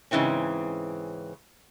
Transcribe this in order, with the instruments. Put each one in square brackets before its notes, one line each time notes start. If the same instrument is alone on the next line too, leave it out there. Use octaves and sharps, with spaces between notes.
[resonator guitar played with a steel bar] G#2 C#3 E3 C4 C#4